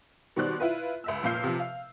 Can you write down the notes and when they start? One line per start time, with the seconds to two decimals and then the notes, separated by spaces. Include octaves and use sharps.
0.36 B2 D#3 G3 C5 D5 F#6
0.60 E4 F4 B4
1.04 C#2 E5 E6
1.23 F1 A#2 F5 E6 G6 C7
1.44 C3 F3
1.59 F5